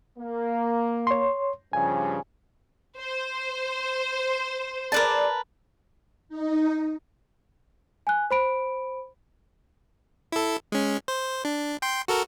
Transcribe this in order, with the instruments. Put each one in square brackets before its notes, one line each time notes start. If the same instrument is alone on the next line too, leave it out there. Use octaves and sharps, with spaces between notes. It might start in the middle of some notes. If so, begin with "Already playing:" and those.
[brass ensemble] A#3
[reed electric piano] C#5 C6
[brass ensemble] G2 C#3 F3 [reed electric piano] G#5
[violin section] C5
[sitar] G#4 D5 [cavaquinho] A#4 B4 A5
[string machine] D#4
[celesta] G#5 F#6
C5 B5 D7
[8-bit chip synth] E4 A4
G#3 C#4
C5
D4
G5 C6
F#4 A4 A#4